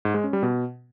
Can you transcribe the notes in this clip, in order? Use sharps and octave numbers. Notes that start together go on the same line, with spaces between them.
G#2
G#3
C#4
G3
B2